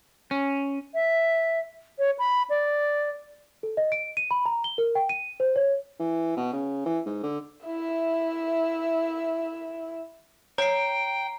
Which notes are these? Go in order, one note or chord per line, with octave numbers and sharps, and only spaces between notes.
C#4
E5
C#5
B5
D5
A4
D#5
D7
D#7
B5
A#5
G7
A#4
G5
D#7
C5
C#5
E3
B2
C#3
E3
G#2
D3
E4 E5
C#5 G5 A#5 C7